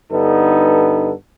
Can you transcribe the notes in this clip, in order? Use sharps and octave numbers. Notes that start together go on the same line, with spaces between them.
G2 D3 B3 D#4 A4